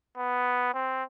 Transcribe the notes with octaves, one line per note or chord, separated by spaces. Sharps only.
B3
C4